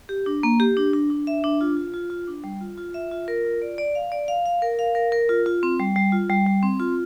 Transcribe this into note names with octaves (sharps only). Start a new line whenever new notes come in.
G4
D4
A#3
G4
D4
D4
D4
E5
D4
F4
F4
F4
F4
D4
G3
F4
F4
E5
F4
A#4
F4
D5
D5
F5
D5
F5
F5
A#4
F5
A#4
A#4
F4
F4
C4
G3
G3
F4
G3
G3
C4
F4